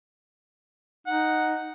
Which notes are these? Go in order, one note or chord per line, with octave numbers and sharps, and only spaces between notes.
D#4 F#5